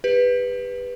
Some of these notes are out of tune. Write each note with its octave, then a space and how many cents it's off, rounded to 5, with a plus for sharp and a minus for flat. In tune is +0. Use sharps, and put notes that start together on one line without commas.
G4 +30 B4 +0